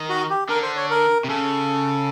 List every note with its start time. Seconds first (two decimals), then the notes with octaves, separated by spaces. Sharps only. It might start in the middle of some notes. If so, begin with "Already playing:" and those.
Already playing: D#3
0.09 F#4
0.30 G4
0.49 D3 A#4
0.63 C5
0.77 C#5
0.90 A#4
1.24 C3
1.29 C#3 A4